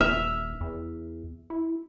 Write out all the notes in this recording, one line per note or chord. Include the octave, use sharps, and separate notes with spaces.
D#1 E5 F6
E2
E4